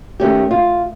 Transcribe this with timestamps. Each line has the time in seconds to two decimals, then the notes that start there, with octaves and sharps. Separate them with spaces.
0.20 D#3 A3 C#4 G4
0.51 F4